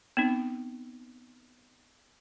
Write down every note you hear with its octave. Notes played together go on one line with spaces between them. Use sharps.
B3 C4 D#4